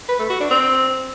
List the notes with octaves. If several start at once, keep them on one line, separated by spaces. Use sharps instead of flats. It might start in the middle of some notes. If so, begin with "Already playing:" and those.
B4
A3
F#4
D4
C4